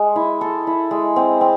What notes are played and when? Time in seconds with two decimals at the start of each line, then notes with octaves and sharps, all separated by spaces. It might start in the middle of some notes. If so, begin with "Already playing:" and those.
Already playing: G#3
0.16 E4
0.41 A4
0.67 E4
0.91 G#3
1.16 C4
1.41 C4